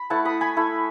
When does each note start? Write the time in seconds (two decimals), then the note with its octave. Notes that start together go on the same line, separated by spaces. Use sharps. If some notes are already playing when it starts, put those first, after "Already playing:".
Already playing: B5
0.10 A3 E4 F#5 A5
0.25 B5 D#6
0.41 G#5 B5
0.57 A3 E4